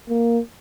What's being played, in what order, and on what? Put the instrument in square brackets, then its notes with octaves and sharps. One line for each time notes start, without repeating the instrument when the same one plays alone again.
[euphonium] A#3